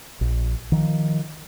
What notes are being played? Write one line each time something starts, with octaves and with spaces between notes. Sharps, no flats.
A#1
D#3 F3